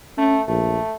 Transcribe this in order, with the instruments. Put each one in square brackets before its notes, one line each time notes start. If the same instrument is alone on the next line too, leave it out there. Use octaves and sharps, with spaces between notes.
[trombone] A3 [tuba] C#4
[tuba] A#1 [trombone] A3